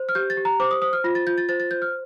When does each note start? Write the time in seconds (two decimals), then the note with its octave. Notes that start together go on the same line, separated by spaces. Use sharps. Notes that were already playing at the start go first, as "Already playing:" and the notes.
Already playing: C5
0.09 F6
0.15 G4 G6
0.30 A6
0.37 G4
0.45 A#5
0.60 C5 D6
0.71 D#6
0.82 C5 D#6
0.93 F6
1.04 F4 A#6
1.15 A6
1.27 F4 G6
1.38 A6
1.49 C5 A6
1.60 A6
1.71 C5 G6
1.82 F6